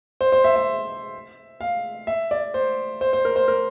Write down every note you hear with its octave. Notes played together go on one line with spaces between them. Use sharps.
C5
C5
E5
E5
F5
E5
D5
C5
C5
C5
A#4
C5
A#4